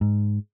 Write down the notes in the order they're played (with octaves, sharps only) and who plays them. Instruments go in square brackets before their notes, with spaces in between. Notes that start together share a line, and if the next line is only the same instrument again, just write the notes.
[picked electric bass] G#2